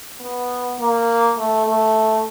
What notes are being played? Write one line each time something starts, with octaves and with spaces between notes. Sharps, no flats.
B3
A#3
A3
A3